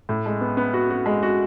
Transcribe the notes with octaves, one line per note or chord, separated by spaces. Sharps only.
A2
G#3
B3
B3
F#4
F#4
G#3
F#4